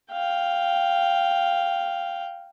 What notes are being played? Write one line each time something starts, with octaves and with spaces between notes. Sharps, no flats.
F5 G5